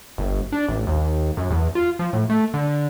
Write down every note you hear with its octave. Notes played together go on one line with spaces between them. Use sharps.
G1
D4
A1
D#2
F#2
E2
F4
F3
A2
A3
D3